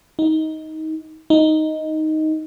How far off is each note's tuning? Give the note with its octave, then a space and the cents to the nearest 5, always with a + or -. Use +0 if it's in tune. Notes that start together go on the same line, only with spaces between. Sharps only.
D#4 +20
D#4 +5